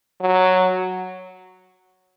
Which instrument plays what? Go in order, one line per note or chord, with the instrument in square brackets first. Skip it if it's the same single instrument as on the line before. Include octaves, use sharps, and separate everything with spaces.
[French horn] F#3